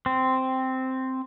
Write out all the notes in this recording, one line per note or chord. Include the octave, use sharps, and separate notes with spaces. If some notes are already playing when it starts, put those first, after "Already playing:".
C4